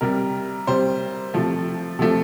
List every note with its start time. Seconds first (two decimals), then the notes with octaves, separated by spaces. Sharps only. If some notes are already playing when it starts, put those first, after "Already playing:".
0.01 C3 G3 A#4
0.67 C3 G3 C5
1.34 C3 F3 A3
1.99 C3 F3 A3 A4